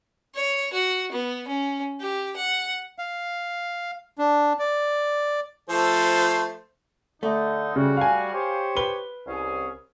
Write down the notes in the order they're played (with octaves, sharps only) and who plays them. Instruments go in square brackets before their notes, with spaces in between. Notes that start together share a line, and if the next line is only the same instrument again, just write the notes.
[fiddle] C#5
F#4
B3
C#4
G4
F#5
[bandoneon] F5
D4
D5
[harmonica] F3 A3 A4 [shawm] C5
[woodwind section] D3 D#4 [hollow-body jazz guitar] A3
[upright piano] C#3 [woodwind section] G3 F#4
[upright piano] F5 G#5
[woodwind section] G4 C5 C#5
[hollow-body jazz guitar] B4 [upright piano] G7
[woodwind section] C2 C#4 G#4